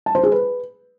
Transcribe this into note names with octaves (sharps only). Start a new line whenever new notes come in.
A5
C5
G#4
B4